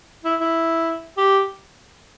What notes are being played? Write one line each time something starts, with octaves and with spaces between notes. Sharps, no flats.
E4
E4
G4